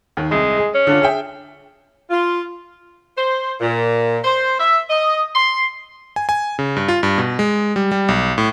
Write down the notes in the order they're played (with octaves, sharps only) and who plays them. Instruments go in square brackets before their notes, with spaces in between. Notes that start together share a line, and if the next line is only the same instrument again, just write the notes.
[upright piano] D#2 D#3
[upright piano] C2 C3 [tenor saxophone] G#3
[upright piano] G#4
[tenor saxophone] C#4
[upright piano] D3 D4 F4
G#4 E5 G5
[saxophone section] F4
[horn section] C5
A#2
C5
E5
D#5
C6
[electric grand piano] G#5
G#5
C#3
G2
F4
G2
B2
G#3
G3
G3
B1
A2